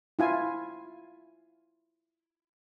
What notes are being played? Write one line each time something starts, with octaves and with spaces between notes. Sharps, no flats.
E4 F4 G#5